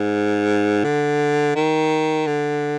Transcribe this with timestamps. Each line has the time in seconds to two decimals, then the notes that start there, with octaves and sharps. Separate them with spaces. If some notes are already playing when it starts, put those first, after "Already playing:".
Already playing: G#2
0.84 D3
1.56 D#3
2.27 D3